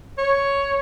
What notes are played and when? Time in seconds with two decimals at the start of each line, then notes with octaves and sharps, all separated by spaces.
0.18 C#5